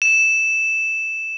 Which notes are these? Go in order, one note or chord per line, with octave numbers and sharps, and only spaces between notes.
E7